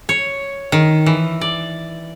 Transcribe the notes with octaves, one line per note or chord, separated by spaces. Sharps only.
C#5
D#3
E3
D5